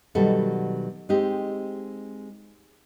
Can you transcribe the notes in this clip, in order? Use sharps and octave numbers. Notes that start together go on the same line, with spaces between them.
B2 D#3 F#3 G3 A4
G#3 C4 D#4 G4